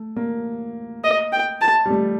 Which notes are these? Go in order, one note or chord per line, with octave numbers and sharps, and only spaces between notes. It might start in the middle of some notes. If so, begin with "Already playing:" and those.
Already playing: A3
A#3
D#5
G5
A5
G3
A3